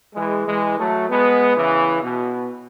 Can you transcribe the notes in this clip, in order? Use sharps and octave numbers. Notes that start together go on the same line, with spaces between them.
E3 G#3
E3 G#3
F#3 A3
G#3 B3
C#3 E3
B2